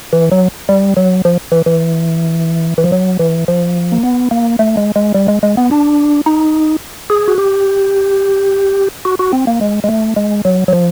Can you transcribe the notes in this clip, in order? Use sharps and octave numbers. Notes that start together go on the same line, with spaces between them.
E3
F#3
G3
F#3
F3
E3
E3
E3
F3
F#3
E3
F3
A#3
B3
A#3
A3
G#3
G#3
G3
G#3
G#3
B3
D4
D#4
G#4
F#4
G4
F#4
F#4
C4
A#3
G#3
G#3
A3
G#3
F#3
F#3
F3